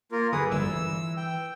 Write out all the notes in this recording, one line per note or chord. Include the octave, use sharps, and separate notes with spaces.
A#3 F4 A#4
F#2 D3 G#4 B4 D#6
G1 F2 E6
E3
G5